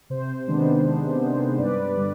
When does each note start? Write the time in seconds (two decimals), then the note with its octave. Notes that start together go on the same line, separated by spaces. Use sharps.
0.10 C3 C5
0.48 D#3 G#3 B3 D4
0.85 C3
1.22 D#3 G#3 B3 D4
1.58 G2 B4 D5
1.96 D3 G3